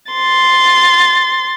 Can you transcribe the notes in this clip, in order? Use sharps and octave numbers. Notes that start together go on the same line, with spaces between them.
C6 A6